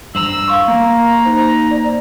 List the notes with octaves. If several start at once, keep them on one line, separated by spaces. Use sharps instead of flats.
G2 C5 A#5 E6 F#7
F5 C6 C#6
A#3 A#5
D#4 C5
D5